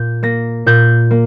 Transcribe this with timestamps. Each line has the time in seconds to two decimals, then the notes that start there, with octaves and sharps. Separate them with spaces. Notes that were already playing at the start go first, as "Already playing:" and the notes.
Already playing: A#2 G6
0.23 A#3 A#6
0.66 A#2 G6
1.11 A#3